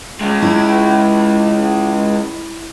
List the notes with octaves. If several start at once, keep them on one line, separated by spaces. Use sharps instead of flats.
C#3 G#3
E4